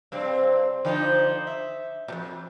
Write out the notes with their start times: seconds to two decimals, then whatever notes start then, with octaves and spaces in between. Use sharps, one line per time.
0.12 G2 C3 C4
0.85 D3 F3 D#4
1.47 E5
2.08 F2 A#2